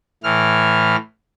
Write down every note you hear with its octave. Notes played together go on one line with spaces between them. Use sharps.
A2 E3 F6